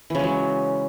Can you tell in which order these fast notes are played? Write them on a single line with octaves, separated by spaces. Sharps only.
E3 C#3 G#3 F#3